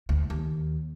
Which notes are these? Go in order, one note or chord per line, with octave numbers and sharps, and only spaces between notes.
D2
D#2